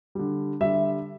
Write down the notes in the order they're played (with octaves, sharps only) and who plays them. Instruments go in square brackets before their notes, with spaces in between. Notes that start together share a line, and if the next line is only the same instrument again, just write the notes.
[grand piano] D3 G3
D3 G3 E5